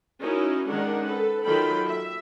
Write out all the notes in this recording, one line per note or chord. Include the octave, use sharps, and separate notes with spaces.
C#4 D#4 E4 F#4 A#4
D#3 G#3 C#4 D4 A#4 F#5
A4 B4
D#3 F#3 F4 A4 G5 B5
E5